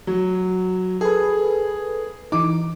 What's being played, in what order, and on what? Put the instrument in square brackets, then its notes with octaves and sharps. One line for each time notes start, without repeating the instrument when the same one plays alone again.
[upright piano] F#3
[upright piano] G#4 [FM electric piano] A4 B4
[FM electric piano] E3 D#4 [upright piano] D6